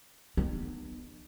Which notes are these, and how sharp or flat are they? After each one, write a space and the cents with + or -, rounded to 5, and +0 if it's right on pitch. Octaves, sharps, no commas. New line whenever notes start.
B3 +0 D#4 -40